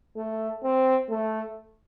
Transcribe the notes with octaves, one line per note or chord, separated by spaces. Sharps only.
A3
C4
A3